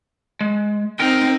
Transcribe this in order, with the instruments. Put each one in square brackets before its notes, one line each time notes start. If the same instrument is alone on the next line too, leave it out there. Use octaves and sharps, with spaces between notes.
[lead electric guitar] G#3
[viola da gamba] C4 D#4 [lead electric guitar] A#4 G5